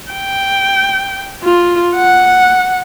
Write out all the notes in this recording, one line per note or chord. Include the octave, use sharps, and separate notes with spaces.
G5
F4
F#5